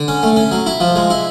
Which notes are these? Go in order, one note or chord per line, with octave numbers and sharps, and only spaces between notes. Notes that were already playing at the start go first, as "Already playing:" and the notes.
Already playing: D3
C#4
A3
C#4
F#3
E4
F3
G#3
E4